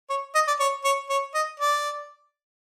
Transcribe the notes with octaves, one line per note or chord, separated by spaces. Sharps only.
C#5
D#5
D5
C#5
C#5
C#5
D#5
D5